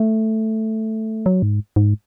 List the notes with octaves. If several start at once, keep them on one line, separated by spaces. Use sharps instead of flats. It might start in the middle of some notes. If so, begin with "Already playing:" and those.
Already playing: A3
F#3
G#2
G#2